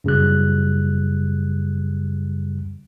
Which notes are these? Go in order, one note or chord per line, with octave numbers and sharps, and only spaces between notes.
F#2 C#3 G3 F#6